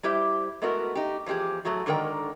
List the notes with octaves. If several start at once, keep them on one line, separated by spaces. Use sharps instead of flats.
G3 E4 G4 C5 E5
G#3 A3 B3 E4 F#4 A#4
D#4 G4
E2 F3 G3 G4 G#4
A2 F#3 A3 F#4 G#4
G#2 D3 D#3 A#4 G5